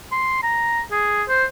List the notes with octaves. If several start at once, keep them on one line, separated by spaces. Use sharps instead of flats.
C6
A#5
G#4
C5